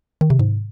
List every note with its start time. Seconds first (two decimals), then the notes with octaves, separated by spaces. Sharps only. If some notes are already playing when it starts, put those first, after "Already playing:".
0.21 D#3
0.30 C3
0.39 G#2